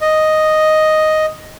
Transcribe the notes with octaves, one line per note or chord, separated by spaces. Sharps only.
D#5